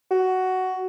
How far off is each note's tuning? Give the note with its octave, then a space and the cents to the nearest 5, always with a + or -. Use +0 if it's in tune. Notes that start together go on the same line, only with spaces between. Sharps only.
F#4 +10